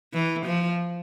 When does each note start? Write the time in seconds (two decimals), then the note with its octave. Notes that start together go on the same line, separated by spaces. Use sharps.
0.13 E3
0.46 F3